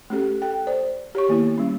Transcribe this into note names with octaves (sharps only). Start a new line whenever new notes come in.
A3 C#4 G4 A4
A4 G5
C5 D5
G4 C#5 C#6
D#3 A#3 B3 E4
G3 C#4